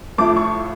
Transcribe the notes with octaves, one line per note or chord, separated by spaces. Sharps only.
A2 F3 A3 D6
C#6